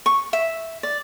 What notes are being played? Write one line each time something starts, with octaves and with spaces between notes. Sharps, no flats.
C#6
E5
D5